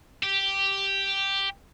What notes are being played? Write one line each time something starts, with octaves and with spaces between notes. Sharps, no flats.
G4